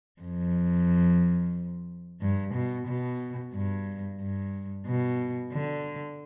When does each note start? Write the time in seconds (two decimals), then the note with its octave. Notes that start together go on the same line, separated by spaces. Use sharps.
0.22 F2
2.21 G2
2.54 B2
2.88 B2
3.54 G2
4.21 G2
4.87 B2
5.53 D3